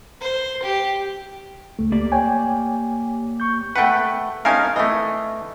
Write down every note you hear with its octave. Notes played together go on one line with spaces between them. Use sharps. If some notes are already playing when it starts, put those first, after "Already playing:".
C5
G4
C#2 A3
A#3 G4 D5
C#5 G5 G#5
C#6 G6
A3 B4 F#5 G5
C#4 D#4 A#4 F5 G#5 A5
E3 A3 D#5